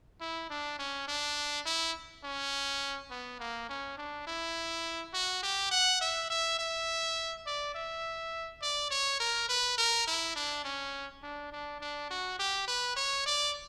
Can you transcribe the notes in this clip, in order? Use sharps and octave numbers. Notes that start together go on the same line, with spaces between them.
E4
D4
C#4
D4
E4
C#4
B3
A#3
C#4
D4
E4
F#4
G4
F#5
E5
E5
E5
D5
E5
D5
C#5
A#4
B4
A#4
E4
D4
C#4
D4
D4
D4
F#4
G4
B4
C#5
D5